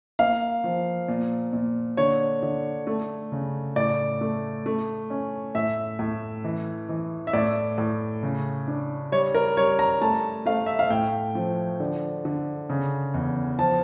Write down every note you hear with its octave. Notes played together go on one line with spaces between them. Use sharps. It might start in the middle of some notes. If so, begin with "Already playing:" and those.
A#3 F5
F3
A#2
A#2
D3 C#5
D3
A3
C#3
A2 D5
A3
A3
C#4
A2 E5
A2
E3
E3
E5
A2 D5
A2
C#3
D4
G3 C#5
A#4
G3 C#5
A#5
A3 A5
A3 F5
E5
F5
A2 G5
F3
D3
D3
C#3
E2
F3 A5